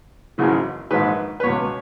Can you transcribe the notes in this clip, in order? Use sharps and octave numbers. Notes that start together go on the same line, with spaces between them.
G#1 F#2 C#3 E3
A#1 G#2 D#3 B4
B4
C#2 B2 C#5